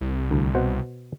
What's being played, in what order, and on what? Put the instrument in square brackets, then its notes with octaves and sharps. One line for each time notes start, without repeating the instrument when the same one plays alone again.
[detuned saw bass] C2
[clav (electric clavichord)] D2
B2 C5 F#5